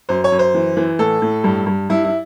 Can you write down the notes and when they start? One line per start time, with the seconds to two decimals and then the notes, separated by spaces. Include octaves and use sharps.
0.09 F#2 C5
0.24 C#5
0.32 F#2
0.39 C5
0.54 E3
0.77 E3
0.99 A2 A4
1.22 A2
1.44 G2
1.66 G2
1.90 G2 E4
2.05 E4